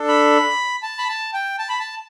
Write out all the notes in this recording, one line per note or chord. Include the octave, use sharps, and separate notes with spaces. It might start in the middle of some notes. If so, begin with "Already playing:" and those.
Already playing: D4 A4
B5
A5
B5
A5
G5
A5
B5
A5